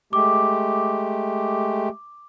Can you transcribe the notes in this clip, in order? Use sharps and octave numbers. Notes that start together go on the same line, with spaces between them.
G#3 A3 G4 D6